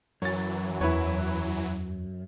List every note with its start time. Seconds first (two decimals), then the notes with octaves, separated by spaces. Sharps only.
0.22 F#2 E3 F#3 C#5 A6
0.81 E2 E4 B4 C#5